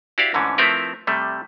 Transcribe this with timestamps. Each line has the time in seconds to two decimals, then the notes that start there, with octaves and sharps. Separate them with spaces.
0.18 E4 F#4 G4 C5 D5 F5
0.34 G#2 D3 E3 A3 C#4
0.58 F3 A3 C4 E4 A#4 B4
1.07 C3 G3 A3